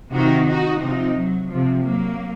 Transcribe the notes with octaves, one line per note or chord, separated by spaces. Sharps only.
C3 D#3 D#4 F#4
D#4 F#4
C3 F3 C4 D#4
F#3
C3 F3
F#3 A#3